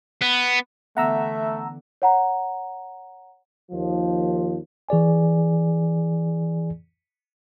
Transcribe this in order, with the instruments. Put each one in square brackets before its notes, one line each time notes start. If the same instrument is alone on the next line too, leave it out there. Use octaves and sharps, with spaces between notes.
[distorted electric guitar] B3
[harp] D3 E3 B3 [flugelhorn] A3 [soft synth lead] E5 [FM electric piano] F#5 A#5 E6
[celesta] C#5 F#5 A#5
[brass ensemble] D#2 F3
[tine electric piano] E3 G#4 D5 G#5